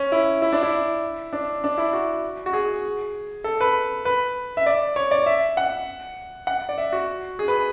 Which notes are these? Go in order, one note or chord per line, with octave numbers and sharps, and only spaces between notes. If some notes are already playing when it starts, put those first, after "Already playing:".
Already playing: C#4
E4
E4
D4
E4
D4
D4
E4
F#4
F#4
G#4
A4
B4
B4
E5
D5
C#5
D5
E5
F#5
F#5
D5
E5
F#4
G#4
B4